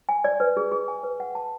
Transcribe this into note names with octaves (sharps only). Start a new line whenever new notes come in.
G#5
D5
B4
G#4
G#4
G#5
B4
F#5
A5